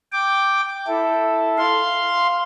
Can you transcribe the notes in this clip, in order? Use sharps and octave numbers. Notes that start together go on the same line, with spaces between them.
G5 D6
E4 A4
F5 C6